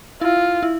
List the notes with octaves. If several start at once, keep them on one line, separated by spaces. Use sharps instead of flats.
E4 F4
E4